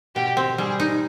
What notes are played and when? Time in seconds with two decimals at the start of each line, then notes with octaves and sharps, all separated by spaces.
0.15 B2 G4
0.37 C4
0.58 G3 G#4
0.80 D#4